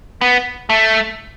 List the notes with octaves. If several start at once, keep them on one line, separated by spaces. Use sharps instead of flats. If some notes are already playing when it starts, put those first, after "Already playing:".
B3
A3